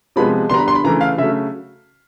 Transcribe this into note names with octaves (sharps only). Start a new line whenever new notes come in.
C3 F3 G#3 B3 B5
D3 G3 B3 A#5 C6
B5
C6
B5
C#3 E3 A3 A#5
F5
C#3 F#3 A3 E5